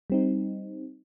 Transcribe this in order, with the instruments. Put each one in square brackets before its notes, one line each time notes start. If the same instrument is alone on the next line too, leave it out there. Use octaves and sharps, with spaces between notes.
[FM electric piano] G3 C4 D#4